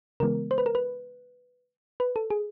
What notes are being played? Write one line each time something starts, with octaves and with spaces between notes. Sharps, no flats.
C#3 E3 G#3 B3 A#4
C5
B4
A#4
B4
B4
A4
G#4